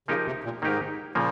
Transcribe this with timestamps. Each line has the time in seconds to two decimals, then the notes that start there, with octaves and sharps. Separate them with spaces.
0.08 C#3 F3 A#3 D#4 G4 A#4
0.26 C3
0.44 A#2
0.62 G#2 D#3 A#3 D#4 G4 A#4
1.15 A#2 C#3 F3 A#3